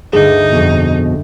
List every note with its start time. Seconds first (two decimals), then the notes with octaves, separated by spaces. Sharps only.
0.13 D2 G2 D3 D4 D#4 G#4
0.51 F2 B2